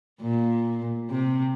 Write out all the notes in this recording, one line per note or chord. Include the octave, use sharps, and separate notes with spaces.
A#2
C3